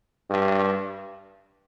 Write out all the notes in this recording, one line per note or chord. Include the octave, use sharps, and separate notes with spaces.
G2